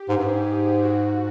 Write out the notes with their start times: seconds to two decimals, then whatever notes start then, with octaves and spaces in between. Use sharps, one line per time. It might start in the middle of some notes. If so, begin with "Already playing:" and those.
Already playing: G4
0.09 G#2 G#4
0.18 G2
0.24 G#2
0.82 F#4